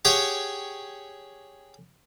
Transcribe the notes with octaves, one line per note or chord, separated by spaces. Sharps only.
G4 G#4 C#5 F#5 G5